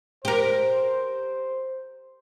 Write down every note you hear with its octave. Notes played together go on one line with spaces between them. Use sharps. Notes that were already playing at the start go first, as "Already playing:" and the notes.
G4 A#4 C5